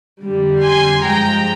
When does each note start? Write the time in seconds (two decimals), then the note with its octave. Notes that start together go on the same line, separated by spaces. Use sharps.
0.21 F2 D3 G3
0.63 G#5 C6
1.05 G2 F3 G#3 G5 A#5